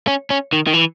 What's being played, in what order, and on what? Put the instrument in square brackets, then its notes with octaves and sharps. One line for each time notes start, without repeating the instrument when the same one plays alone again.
[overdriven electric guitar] C#4
C#4
D#3
D#3
E3